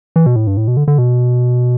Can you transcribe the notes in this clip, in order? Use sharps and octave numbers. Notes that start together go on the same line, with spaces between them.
E3
B2
A2
G2
A2
B2
D3
D3
B2